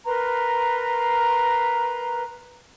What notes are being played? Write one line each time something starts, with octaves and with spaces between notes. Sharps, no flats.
A#4 B4 A#5 C6